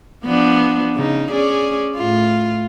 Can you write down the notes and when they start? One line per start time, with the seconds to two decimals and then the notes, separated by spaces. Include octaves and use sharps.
0.24 F3 B3 D4
0.95 C#3 D#4
1.31 C#4 G#4 D5
1.96 A2 F4